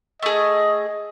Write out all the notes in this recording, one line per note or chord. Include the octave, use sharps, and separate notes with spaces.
A3 G#4 D#5